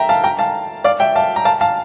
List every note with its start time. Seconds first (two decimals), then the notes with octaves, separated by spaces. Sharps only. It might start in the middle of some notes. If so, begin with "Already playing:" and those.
Already playing: E5 G5 A#5
0.09 F5 A5
0.24 G5 A#5
0.39 F5 A5
0.84 D5 F5
1.00 E5 G5
1.16 F5 A5
1.36 A#5
1.45 F5 A5
1.61 F5 A5